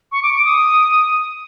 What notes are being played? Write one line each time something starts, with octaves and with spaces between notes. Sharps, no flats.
C#6
D6
D6
D#6